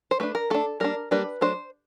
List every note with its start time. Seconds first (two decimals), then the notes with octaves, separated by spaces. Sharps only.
0.11 C5
0.20 A3 D4 B4
0.35 A#4
0.50 A3 D4 A4
0.80 G3 A#3 D4 A#4
1.11 G3 A#3 D4 B4
1.41 F#3 A3 D4 C5